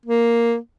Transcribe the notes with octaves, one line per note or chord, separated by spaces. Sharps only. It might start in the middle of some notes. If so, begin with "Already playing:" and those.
A#3